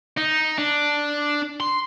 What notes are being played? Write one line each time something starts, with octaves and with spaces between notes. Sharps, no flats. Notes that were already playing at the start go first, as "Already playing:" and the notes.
D#4
D4
C6